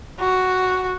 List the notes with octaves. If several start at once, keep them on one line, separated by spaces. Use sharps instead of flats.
F#4